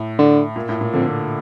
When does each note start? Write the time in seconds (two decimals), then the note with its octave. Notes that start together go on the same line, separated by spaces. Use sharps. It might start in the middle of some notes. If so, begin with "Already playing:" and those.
Already playing: A2
0.19 D3
0.56 A#2
0.69 A2
0.81 A#2
0.94 F2 D3